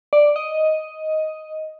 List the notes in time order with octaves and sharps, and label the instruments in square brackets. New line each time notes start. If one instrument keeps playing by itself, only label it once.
[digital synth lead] D5
D#5